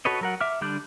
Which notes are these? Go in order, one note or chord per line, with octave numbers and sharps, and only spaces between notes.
F#4 A4 B4 C#5 D#5
F#3 A#4 F#5
E5 D6 F6
D3 G3 D4 D5 G6